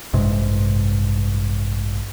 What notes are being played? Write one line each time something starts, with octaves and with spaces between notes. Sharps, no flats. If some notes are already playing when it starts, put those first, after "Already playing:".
A1 G2 C3 G#3